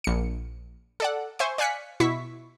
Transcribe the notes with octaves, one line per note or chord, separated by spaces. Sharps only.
A#1 C#7
A4 D5 F#5
C5 E5 G#5 C#6
D5 F5 G#5 F#6 B6 C#7
B2 E4 C#6 B6